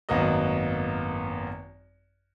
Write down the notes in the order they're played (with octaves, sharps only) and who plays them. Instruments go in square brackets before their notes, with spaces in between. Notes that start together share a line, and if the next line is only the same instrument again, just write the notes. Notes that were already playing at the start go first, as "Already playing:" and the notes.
[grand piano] G#1 F#2 A#3 B3 F#4 D#5